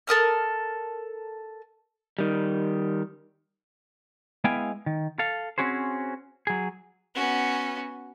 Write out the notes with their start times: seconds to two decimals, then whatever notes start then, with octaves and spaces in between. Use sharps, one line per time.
0.07 A4 A#4 D#6 F6
2.19 D#3 G3
4.44 G#3 B3 E4 F5 G5 G#5
4.86 D#3
5.19 A4 F5
5.58 C4 C#4 F#4 G#4 C5
6.47 F#3 G#4
7.15 B3 C#4 F#4